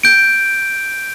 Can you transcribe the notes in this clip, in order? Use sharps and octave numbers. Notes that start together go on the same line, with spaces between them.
G6 D7